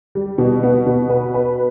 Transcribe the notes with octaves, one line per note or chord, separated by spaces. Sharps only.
G3
B2
B3
B2
B4
B4